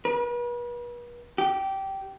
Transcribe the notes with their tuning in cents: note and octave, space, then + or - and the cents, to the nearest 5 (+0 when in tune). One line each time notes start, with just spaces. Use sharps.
B4 -40
G4 -15